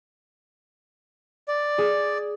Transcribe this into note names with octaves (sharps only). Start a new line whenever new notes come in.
D5
G#4